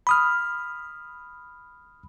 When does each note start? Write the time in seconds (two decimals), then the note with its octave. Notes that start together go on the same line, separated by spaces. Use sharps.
0.07 B5 D#6 F6